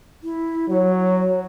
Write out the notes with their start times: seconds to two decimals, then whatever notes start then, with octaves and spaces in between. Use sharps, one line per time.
0.23 E4
0.69 F#3 C#5